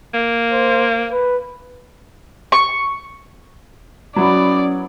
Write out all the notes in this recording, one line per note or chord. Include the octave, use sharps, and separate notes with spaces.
A#3
C5
B4
C#6
F#3 B3 C#4 E4 C#5 D5